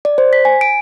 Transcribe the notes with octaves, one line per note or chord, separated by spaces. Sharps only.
D5
C5
B6
G#5
D7